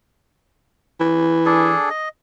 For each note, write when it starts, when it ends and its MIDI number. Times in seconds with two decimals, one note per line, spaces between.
1.00 1.73 52
1.46 1.89 62
1.46 1.89 68
1.46 1.89 69
1.90 2.09 75